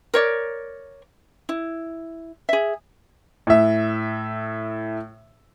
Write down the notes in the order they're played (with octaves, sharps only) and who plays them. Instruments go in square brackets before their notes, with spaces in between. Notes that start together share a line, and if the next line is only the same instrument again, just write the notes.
[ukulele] A#4 C#5 D5
E4
G#4 E5
[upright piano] A2 E5